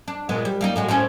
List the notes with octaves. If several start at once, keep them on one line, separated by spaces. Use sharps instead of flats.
D4
A#2 G#3 B3
G3
G3 A#3 D#4
A2 G#3 F#4
A2 C4 C#4